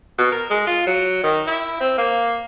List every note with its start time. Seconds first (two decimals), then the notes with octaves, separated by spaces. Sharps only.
0.18 B2
0.32 A#4
0.50 G#3
0.67 F4
0.87 F#3
1.23 D#3
1.47 E4
1.80 C4
1.97 A#3